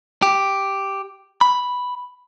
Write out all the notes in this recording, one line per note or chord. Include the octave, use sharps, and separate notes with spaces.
G4
B5